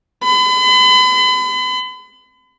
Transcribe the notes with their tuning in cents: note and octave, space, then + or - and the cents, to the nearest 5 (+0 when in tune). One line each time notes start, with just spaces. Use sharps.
B5 +40